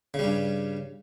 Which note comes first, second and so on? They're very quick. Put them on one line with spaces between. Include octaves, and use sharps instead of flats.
C#3 G3 G2